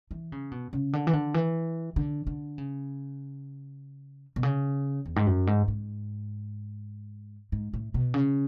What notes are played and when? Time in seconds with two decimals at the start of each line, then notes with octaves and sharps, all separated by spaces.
0.11 E3
0.32 C#3
0.51 B2
0.73 C#3
0.93 D3
1.07 E3
1.13 D3
1.34 E3
1.96 D3
2.27 D3
2.58 C#3
4.36 B2
4.43 C#3
5.06 E2
5.16 G#2
5.27 F#2
5.47 G#2
5.68 G#2
7.52 G#2
7.73 A2
7.94 B2
8.14 C#3